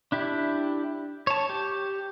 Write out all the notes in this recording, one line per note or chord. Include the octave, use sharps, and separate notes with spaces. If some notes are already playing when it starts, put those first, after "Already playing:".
D4 E4 G4
C#5 A5
G4